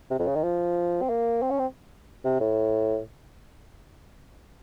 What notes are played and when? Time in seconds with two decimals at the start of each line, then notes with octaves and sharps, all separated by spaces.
0.11 C3
0.19 F2
0.27 C#3
0.35 D#3
0.43 F3
1.02 C4
1.09 A#3
1.42 C4
1.50 C#4
1.59 C4
2.24 C3
2.40 A2